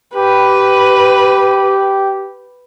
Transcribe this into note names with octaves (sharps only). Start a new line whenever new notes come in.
G4 B4